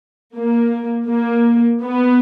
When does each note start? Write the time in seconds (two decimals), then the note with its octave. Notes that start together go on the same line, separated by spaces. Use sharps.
0.37 A#3
1.09 A#3
1.83 B3